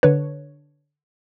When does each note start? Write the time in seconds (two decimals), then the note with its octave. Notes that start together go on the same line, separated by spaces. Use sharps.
0.03 D3 D4 B4 C#5